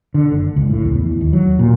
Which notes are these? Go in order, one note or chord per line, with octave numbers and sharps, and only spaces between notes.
D3
F#1
C#2
A2
E2
E3
D#2
F#3
A#2